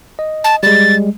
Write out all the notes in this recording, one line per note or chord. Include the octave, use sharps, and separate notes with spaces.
D#5
A5
G3 G#3 A6